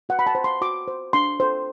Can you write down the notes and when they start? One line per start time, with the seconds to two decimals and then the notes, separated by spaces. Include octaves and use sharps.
0.09 F#4 F#5
0.19 B5
0.27 A5
0.35 C5
0.44 C6
0.62 F#4 D6
0.88 C5
1.13 D4 C6
1.40 A4 C5